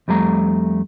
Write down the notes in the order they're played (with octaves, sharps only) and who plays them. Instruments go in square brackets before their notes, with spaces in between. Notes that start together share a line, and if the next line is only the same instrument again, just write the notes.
[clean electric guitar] F2 G3 A3 A#5